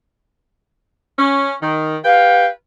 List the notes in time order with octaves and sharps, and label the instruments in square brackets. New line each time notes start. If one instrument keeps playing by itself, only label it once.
[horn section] C#4
D#3
[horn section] G4 B4 G5 [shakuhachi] F5